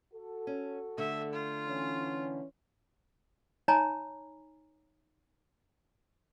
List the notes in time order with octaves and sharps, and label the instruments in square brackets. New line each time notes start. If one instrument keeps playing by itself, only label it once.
[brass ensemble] F#4 A4
[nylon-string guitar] C#4
[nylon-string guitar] D3 A3 [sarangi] E5
[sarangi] F4
[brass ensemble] E3 C#4
[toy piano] D#4 C#5 G#5 A#5 B5